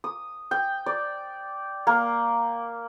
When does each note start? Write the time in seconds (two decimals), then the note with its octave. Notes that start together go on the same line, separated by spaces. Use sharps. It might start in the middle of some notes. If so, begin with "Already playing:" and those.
0.04 D#6
0.51 G5
0.86 D5
1.87 A#3